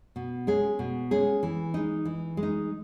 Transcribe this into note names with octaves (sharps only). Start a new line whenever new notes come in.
B2
G#3 C#4 G#4
B2
G#3 C#4 G#4
E3
G#3 D#4
E3
G#3
D#4